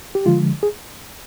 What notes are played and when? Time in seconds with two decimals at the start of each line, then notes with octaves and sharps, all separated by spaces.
0.15 G4
0.26 D3 F3 G#3 F4
0.63 G#4